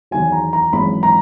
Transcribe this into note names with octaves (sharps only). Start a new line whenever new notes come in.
E2 D#3 F#3 G#5
A#5
A#5
G#1 F#2 E3 G#3 B5
A#5